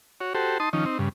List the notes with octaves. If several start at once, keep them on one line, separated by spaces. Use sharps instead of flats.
F#4 C#5
F#4 G4 A4 C5
D#4 A5 C6 D#6
D#3 F3 C#4 D#4
C4 D#4
G2 C#3